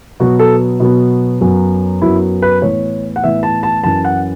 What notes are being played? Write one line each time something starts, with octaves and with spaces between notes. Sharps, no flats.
B2 F#3 B3 F#4
A4
B2 F#3 B3
F#2 F#3 B3
F#2 F#3 B3 E4
B4
A2 E3 B3 C#5
F#5
A2 E3 B3 E5
A5
A5
F#2 E3 C#4 A5
F#5